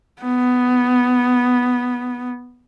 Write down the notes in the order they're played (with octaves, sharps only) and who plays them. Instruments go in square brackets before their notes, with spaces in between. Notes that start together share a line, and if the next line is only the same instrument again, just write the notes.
[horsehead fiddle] B3